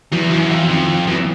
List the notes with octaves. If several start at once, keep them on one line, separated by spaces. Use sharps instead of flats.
E2 E3 F#3
F#2 E3 F#3
E2
F2
F2 D#3 F3
E2 E3 F#3